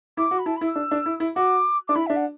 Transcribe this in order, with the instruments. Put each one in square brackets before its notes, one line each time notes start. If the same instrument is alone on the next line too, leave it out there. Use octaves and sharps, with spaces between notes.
[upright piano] E4 [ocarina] D6
[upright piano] F#4
[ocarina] B5
[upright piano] E4 [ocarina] A5
[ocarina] B5
[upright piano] E4
[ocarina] E6
[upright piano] D4
D4
E4
E4
[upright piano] F#4 [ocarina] D6
[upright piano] D4 [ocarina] D6
[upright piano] E4 [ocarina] B5
[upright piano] D4 [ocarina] E5
[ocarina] F#5